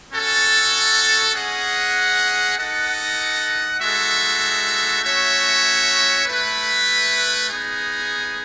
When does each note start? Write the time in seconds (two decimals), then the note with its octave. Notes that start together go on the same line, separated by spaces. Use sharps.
0.12 C#4 F#4 A4
1.34 C#4 G#4 D#5 F#5
2.57 D#4 A4 D#5 F#5
3.80 G#3 D#4 F#4 A4 E5
5.02 A3 C#4 F#4 C#5 E5
6.26 A3 E4 B4
7.48 B3 D#4 G#4